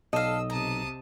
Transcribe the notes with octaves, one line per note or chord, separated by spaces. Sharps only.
B1 A4 D#5 F5 E6
C3 A5 A#5 D#6